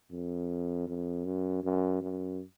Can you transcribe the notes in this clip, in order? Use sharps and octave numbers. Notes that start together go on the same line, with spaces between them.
F2
F2
F#2
F#2
F#2